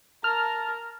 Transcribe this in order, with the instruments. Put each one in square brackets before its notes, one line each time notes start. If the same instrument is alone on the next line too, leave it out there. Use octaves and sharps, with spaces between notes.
[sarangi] A#4 [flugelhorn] A5 [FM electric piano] F6